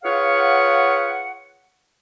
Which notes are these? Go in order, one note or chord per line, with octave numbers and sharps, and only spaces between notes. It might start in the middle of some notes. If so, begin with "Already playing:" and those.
F4 G#4 B4 C#5 F5 F#5